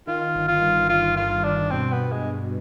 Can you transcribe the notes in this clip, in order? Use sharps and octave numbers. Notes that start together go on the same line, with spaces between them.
D#3 F4
G1
F4
G2
D#3 F4
G2 F4
G2 D4
B2 C4
B3
B2
G#3
B2